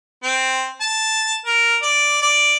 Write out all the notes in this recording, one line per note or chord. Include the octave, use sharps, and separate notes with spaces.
C4
A5
A#4
D5
D5